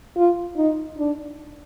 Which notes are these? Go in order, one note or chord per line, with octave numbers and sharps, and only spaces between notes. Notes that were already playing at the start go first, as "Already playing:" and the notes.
F4
D#4
D4